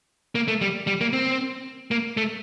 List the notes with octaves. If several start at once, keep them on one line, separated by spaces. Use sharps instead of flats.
A#3
A3
G3
G3
A#3
C4
A#3
A3